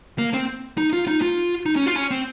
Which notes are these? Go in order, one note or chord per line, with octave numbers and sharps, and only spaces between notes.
A#3
C4
D#4
F4
D#4
F4
D#4
C#4
F4
C#4
C4